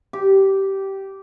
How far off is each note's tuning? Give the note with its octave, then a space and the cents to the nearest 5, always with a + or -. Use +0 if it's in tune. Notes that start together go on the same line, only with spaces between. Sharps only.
G4 -15